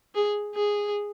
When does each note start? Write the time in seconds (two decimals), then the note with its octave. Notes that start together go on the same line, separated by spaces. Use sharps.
0.15 G#4
0.55 G#4